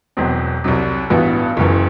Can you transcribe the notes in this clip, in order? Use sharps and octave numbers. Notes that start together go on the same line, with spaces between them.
E1 E2 B2 F#3 C4
C2 C3 F#3
A1 G2 E3 B3 F#4
F#1 F#2 E3